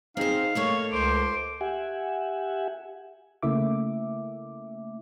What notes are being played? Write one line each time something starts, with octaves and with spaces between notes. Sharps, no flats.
C4 D#4 G#4 C5 F5
A3 A#3 A4 C#5
C#2 C5 D6
G4 E5 F#5 G#5
C#3 A3 A#3 E4 E5 D6